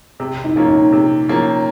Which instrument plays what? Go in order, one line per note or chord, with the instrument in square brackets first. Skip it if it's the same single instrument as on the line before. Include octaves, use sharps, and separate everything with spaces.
[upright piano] C3
[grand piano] D#4
[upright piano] F3 A#3 C#4
[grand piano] D#4
[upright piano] C3
F3 A#3 C#4